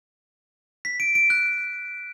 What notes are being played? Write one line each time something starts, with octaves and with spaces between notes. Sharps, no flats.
B6
D7
D7
F#6